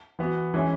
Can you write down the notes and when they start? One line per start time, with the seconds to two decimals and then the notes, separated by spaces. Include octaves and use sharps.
0.19 E3 B3 F#4
0.54 E3 G#3 C#4 E4